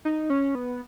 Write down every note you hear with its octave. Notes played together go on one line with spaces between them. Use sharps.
D#4
C#4
B3